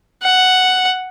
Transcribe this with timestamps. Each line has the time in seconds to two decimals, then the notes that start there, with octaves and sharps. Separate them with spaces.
0.23 F#5